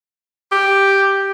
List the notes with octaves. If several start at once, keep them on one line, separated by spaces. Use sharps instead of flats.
G4